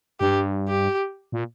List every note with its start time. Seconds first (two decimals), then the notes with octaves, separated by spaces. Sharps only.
0.20 G2 G4
0.69 G4
1.32 A#2